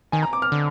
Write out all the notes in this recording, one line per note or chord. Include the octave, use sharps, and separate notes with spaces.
D#3 G#5
A#5
D6
F6
D3